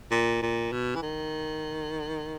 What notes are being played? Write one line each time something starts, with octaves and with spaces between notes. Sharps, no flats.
A#2
A#2
B2
E3
D#3